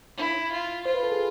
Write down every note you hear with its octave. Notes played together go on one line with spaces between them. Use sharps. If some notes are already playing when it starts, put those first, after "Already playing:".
E4
F4
F4 C5
B4
A4
G#4